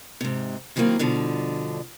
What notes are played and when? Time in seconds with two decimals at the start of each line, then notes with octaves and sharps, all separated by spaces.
0.21 G#2 C3
0.76 D#3 E3 F#3 A3 A#3 C4
0.99 G2 B2 D3 F3